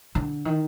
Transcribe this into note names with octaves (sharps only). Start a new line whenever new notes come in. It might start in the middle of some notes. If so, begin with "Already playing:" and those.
D3
D#3